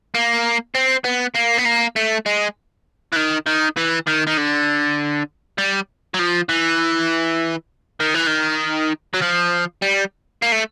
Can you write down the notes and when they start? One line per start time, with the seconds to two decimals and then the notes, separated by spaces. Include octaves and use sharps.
0.15 A#3
0.75 C4
1.05 B3
1.35 A#3
1.58 B3
1.65 A#3
1.96 A3
2.26 G#3
3.13 E3
3.16 D#3
3.47 D#3
3.77 E3
4.07 D#3
4.27 D#3
4.38 D3
5.58 G3
6.14 F#3
6.19 F3
6.49 E3
8.00 D#3
8.14 E3
8.27 D#3
9.14 F#3
9.21 F3
9.82 G3
10.42 A#3
10.52 A3